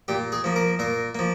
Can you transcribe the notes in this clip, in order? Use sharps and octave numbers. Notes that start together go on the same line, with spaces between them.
A#2 G4
G#4
F3 A#3
A#4
A#2 A#4
F3 A#3